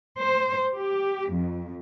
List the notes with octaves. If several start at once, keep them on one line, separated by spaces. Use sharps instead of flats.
C5
G4
F2